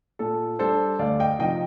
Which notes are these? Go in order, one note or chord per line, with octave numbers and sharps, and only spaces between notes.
A#2 A4
G3 D4 A4 C5
D2 D5 F5
D#5 G5
C3 F3 C4 D#4 D#5 G5